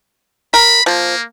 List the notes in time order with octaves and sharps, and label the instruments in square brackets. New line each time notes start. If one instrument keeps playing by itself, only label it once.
[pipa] A#4 [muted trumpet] B5
[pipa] F3 [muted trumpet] A#3